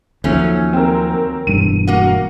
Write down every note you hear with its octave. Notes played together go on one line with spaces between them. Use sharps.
D#2 F3 F#3 A3 C#4
C4 A#4
E1 G2 D#7
A#3 F#4